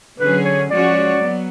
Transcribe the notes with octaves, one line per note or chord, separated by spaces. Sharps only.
D3 F#3 C#4 G#4 B4
C#5
F3 G#3 C#4 F#4 C#5 D5
F#3 B3